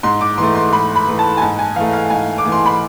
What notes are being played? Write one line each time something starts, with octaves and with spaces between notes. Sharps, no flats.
G#2 C6
D6
E3 A3 C6
C6
G#2 B5
B5
E3 A3
A5
G#5
G#2 A5
G#5
E3 A3 F5
F5
G#2 G#5
D6
E3 A3
C6
B5